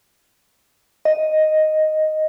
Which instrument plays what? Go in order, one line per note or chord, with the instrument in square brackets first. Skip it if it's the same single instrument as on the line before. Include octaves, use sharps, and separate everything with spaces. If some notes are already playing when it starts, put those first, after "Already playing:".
[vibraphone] D#5